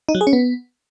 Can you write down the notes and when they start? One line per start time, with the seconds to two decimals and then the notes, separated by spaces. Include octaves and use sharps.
0.09 D#4
0.15 F#3
0.21 G#4
0.27 C#4
0.33 B3